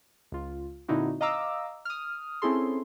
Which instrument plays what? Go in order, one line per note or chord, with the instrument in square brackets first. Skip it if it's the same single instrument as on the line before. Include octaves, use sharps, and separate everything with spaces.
[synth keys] C#2 F4
A#2 D3 C4 D#4 E4 F#4
D#5 F5 A#5 D6 E6
D#6 F6
C4 C#4 E4 G#4 A4 C6